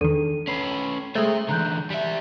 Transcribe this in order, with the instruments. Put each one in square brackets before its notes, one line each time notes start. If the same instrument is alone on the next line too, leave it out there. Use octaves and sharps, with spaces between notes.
[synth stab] E2 D#3 [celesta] D4 A4 D#7
[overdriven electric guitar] C#4 B4 [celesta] C7
[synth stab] G#3 A3 [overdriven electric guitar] C5 E5
[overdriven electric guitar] D3 E3 [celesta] A#5 F#6 G6
[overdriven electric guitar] G3 E5 [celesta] B6